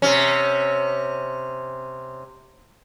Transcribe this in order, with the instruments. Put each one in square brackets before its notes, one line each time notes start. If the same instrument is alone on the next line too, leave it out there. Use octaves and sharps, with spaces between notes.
[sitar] C3 C#4